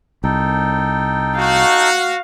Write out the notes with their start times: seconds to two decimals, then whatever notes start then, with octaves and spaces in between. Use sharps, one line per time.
0.24 C2 D#4 A4 G5
1.39 F#4 F5